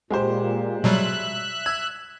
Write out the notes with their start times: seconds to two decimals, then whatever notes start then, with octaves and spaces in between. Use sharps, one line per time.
0.11 A#2 G#3 G4 C5
0.84 B2 F#3 G3 E5 F#6
1.66 E6 G#6